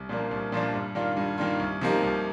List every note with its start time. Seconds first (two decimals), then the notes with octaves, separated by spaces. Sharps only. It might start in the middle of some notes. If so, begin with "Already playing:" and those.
Already playing: C2
0.09 A#2 F3 A#3 D4
0.31 C2
0.52 A#2 F3 A#3 D4
0.74 G2
0.95 D#3 A#3 D4 F4
1.17 G2
1.38 D#3 A#3 D4 F4
1.59 C2
1.81 C3 F3 A#3 D#4
2.03 C2